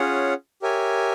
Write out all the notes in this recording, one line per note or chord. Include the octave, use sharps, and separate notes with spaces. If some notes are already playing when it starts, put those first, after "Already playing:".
Already playing: C#4 F4 G#4 C#5 F#5
G4 A#4 C#5 E5 G#5